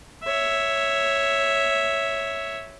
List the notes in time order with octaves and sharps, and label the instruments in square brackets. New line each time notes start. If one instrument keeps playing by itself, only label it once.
[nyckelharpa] C#5 E5